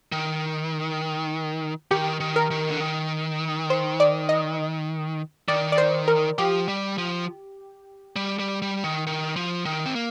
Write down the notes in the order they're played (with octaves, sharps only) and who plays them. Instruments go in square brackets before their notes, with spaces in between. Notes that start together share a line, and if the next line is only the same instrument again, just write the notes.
[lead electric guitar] D#3
[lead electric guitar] D#3 [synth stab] G4
[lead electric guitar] D#3
[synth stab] A#4
[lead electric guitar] D#3
D3
D#3
[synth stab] C5
D5
D#5
[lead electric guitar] D#3 [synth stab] D5
[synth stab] D5
C5
A#4
[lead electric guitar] F3 [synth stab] G4
[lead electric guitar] G3
F3
G3
G3
G3
D#3
D#3
F3
D#3
C4
A#3